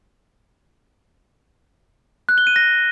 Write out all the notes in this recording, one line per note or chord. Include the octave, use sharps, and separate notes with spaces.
F#6
G7
D#7
A#6